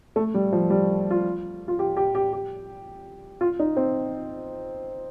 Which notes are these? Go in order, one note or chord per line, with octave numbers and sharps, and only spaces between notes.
A3
G3
F3
G3
F4
F4
G4
G4
G4
G4
F4
D#4
C4